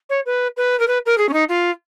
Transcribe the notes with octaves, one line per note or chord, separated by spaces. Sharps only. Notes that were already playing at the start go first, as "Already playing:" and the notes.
C#5
B4
B4
A#4
B4
A#4
G#4
C#4
D#4
F4